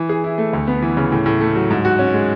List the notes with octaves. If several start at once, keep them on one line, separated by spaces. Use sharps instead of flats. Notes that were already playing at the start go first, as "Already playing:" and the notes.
Already playing: E3
G#4
E4
A3
D2
B3
E3
C#3
A2
A2
A3
F#3
G#2
F#4
C#4
G#3